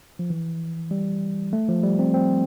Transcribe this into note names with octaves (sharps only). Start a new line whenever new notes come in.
F3
E3
G3
A3
F3
G3
C4
C4